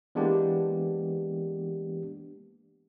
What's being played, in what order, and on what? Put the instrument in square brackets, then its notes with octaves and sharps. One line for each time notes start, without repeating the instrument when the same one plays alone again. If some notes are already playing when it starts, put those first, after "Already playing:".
[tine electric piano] E3 G#3 A#3 B3 D4 G4